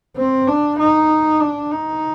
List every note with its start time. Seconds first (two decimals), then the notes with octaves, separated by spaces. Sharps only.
0.17 C4
0.47 D4
0.78 D#4
1.40 D4
1.71 D#4